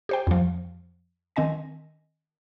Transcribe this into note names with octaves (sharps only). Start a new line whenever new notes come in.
G4 C5 G5
F2 F3
D#3 C4 D#5 G#5 A#6